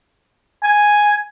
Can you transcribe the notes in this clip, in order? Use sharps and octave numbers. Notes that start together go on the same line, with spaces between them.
G#5